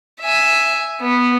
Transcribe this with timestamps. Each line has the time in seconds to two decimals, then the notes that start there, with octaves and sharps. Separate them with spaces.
0.20 E5 G#5
1.00 B3